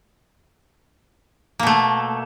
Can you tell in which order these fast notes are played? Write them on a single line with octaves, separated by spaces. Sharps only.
A#3 B2 A3